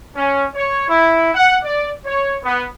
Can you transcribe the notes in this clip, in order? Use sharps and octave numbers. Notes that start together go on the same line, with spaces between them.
C#4
C#5
E4
F#5
D5
C#5
B3